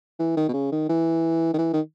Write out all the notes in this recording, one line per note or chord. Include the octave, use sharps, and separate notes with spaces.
E3
D#3
B2
C#3
D#3
E3
D#3
E3
D#3